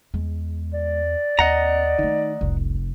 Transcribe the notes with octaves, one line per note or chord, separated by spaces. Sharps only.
E2 G#3
D5
D#2 C4 D#5 F#5 A#5
D#3 A3 D#4
F1 C2